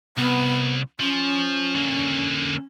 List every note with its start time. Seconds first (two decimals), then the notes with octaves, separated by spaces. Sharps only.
0.17 C2 B3
1.00 F3 C#4
1.75 D3 A#3